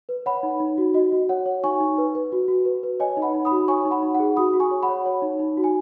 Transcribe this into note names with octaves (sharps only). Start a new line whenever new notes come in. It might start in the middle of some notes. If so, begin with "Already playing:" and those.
B4
C#5 F#5 B5
D#4
D#4
F#4
F#4 D#5
F#4
C#5 F#5
C#5
D#4 G#5 C#6
D#4
B4
B4
F#4
F#4
B4
B4
C#5 D#5 G#5
D#4
F#5 B5
D#4
B5 D#6
F#4
C#5 G#5 C#6
D#4
F#5 B5
D#4
F#5
G#4
F#4 B5 D#6
F#4
G#5 C#6
C#5
F#5 B5
C#5
C#5
D#4
D#4
F#4
G#5